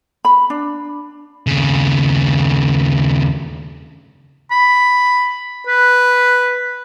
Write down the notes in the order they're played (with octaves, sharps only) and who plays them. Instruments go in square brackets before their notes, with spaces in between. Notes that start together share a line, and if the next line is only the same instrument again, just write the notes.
[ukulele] B5
D4
[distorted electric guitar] D#2 C#3
[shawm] B5
B4